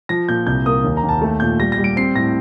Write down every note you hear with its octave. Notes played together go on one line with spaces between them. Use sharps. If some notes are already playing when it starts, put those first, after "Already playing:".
F3 A#6
A#2 G6
C2 G6
A#3 D#6
D#2
A#5
D#2
A5
A3 A5
A#2 G6
G3 A#6
A#6
G3
D7
C4 C7
A2 A#6